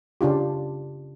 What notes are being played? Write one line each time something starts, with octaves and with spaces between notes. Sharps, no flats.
C#3 D4 F4 G4